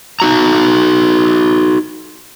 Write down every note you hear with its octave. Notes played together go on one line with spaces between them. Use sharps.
D#4 F#4 A#5